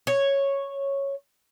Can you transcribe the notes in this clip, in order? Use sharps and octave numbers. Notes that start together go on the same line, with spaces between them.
C#5